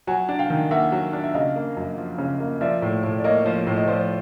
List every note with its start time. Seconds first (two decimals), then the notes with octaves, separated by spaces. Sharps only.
0.07 F#3 F#5 G#5
0.29 D4
0.39 F5 G5
0.50 D#3
0.71 A#3 E5 F#5
0.92 F#3
1.13 D4
1.24 E5
1.34 C#3 D#5 F5
1.56 A#3
1.77 F#2
1.98 F3
2.18 C#3
2.40 A#3
2.61 F3 D5 E5
2.82 A2
3.03 A2
3.18 D5
3.24 A#3 C#5 D#5
3.46 F3
3.67 A2
3.77 D#5
3.88 F3 C5 D5